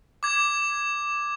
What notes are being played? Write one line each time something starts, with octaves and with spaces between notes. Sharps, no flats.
D6 G#6